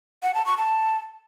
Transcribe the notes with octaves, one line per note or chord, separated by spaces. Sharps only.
F#5
A5
C#6
A5